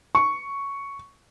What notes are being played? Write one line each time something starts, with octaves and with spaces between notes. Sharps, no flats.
C#6